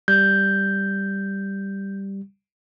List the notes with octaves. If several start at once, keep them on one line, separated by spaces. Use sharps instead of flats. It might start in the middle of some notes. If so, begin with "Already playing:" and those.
G3 G6